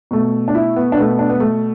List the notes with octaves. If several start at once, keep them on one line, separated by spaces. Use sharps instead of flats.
B2 A3
D4
E4
B3
D4
B2 A3 B3
D4
B3
A3